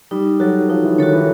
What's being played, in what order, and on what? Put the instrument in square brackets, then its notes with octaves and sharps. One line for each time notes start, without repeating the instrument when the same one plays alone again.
[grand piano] G3 [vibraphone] D#4
[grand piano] F#3 [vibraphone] F#4 A4 C#5
[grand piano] F3 [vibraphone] D#4
[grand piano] E3
[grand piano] D#3 [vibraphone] F#4 A4 C#5
[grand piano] E3